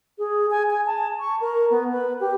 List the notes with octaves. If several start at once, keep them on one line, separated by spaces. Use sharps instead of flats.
G#4
G#5
G#5
A5
C#6
A#4
B3
B4
G4